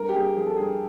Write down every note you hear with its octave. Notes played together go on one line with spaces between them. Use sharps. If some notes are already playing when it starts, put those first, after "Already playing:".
Already playing: G2 A#4
G4
G2 G#4
F3 G#4
A4
G2 G#4